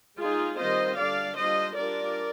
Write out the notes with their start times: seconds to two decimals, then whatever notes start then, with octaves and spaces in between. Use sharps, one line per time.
0.20 G#3 D#4 F4 G#4
0.58 D#3 G3 C4 F4 C5 D#5
0.98 D3 G3 D4 D5 F5
1.37 G3 D4 F4 C5 D#5
1.76 G3 D4 F4 A#4 D5